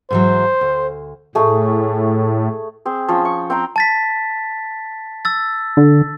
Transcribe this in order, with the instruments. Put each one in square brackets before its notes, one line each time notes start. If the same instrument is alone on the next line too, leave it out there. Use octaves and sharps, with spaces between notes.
[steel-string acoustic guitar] G#2 E3 F#3 [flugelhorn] C5
[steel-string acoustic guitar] D2
[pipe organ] A2 [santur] A3 G#4
[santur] C4 G#4
F3 C#4
C#6
C4 G5 A#5 C6
[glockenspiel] A5 A6 B6
E6 A6
[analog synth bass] D3